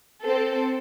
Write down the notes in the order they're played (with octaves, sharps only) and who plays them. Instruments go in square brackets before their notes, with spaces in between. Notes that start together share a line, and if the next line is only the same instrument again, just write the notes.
[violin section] C4 A4